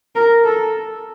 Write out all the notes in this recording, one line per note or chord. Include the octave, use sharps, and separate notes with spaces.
A#4
A4